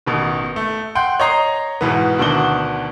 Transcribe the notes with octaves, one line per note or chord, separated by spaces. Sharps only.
A1 B2 D#3
A3
F#5 G5 C6 G6
C#5 D#5 A#5 C7
G#2 B2 E3 B3
D2 B2 D#3 D4 F#4 G7